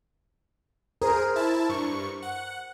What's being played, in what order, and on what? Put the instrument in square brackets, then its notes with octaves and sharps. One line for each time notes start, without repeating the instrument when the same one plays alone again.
[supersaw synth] G#4 [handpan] A#4 C5
[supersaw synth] E4 A5
G2 C#6
F#5